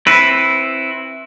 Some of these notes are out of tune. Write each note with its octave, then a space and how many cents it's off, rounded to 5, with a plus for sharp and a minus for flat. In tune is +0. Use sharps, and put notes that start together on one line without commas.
C4 +20 E4 +0 B4 +0